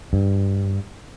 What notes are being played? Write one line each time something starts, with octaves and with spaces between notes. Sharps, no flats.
G2